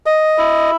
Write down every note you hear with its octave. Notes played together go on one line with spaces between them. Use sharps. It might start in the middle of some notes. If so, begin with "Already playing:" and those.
D#5
E4